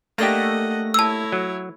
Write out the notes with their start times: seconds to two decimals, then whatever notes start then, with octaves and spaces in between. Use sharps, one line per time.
0.18 A3 A#3 D4 G4 D#5 F#5 A#6
0.94 E4 C#5 A5 E6
1.32 F#3